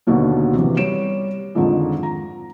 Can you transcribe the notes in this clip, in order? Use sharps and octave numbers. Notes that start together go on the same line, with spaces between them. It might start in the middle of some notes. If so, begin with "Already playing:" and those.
D#2 B2 D3 D#3 A#3
C3 E3
G3 C#5 D7 E7
F2 G#2 D3 D#3 F3
A#5